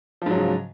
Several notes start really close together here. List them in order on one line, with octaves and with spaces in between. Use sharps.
F3 G#2 F#3 C#3